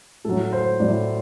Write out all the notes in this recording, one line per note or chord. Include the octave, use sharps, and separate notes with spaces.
A2 F#3 A4
C5
A2 F#3 D5